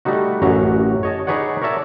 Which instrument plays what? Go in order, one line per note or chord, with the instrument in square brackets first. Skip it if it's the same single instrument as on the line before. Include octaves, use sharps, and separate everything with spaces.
[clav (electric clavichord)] G3 A3 D#4 F#4
A1 F#2 F#4 A#5
C#5 D#5 A5
D#4 G#4 B4 C#5 D5 F#5
A#4 C#5 D5 E5 A5